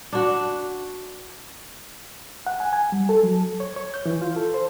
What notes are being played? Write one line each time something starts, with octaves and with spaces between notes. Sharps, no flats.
D4 F#4
F#5
G#5
G#5
G3
A4
F#3
C#5
C#5
G6
E3
F4
A4
C5